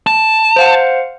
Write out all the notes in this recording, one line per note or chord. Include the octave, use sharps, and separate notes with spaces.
A5
C5 F5 F#5